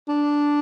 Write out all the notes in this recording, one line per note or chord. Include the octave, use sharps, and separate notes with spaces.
D4